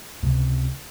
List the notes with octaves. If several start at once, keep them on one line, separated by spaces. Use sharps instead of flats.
C#2 C3